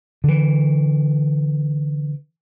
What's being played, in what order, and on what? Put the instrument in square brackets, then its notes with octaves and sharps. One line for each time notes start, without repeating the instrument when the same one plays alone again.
[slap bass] D3 E3